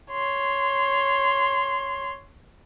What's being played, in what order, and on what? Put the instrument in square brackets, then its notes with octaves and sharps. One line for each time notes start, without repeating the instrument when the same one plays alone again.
[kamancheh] C#5 C6